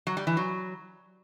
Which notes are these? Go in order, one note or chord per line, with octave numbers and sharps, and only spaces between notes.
F#3
G3
E3
F#3